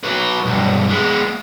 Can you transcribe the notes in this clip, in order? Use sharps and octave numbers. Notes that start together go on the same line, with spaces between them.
F#3 B4
B1 G2
G#3 B3